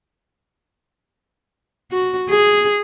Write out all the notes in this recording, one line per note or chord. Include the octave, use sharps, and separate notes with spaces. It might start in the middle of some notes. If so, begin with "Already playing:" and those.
F#4
G#4